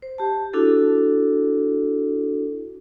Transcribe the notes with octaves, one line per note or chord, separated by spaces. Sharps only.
C5
G4 A5
D4 E4 F#4 A4